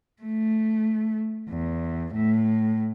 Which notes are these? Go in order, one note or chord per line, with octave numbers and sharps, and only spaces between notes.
A3
E2
A2